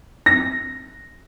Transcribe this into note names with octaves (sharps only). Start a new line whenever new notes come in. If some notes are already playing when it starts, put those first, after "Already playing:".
A#6